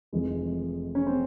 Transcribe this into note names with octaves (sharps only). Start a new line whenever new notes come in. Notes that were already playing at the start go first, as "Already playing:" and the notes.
F1 F2 E3 G#3
C#4
C4